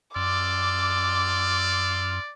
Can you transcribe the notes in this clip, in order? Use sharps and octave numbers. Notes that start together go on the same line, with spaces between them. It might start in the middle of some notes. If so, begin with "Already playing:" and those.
F#2 D5 C6 D6 E6 F6